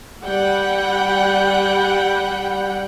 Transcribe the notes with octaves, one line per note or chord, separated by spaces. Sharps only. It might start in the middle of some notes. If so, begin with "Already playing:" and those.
G3 F#5 G5